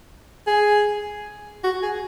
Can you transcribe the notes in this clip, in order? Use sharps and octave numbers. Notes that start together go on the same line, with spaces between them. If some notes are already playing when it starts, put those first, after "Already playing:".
G#4
F#4
G#4